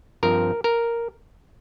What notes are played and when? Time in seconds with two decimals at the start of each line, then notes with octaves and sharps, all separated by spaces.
0.23 G2 F3 C4 A#4
0.64 A#4